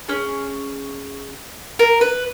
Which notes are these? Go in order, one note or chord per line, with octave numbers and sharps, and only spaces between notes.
C#4 G#4
A#4
B4